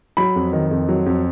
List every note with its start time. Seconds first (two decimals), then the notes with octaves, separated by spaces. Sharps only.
0.17 F#3 B5
0.36 F2
0.53 D#3
0.71 F2
0.89 F#3
1.06 F2